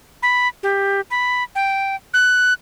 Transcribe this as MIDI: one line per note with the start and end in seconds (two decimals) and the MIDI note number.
0.23 0.48 83
0.63 1.01 67
1.11 1.43 83
1.55 1.95 79
2.14 2.54 90